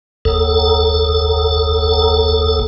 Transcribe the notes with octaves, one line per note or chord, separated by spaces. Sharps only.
F#1 D#2 A4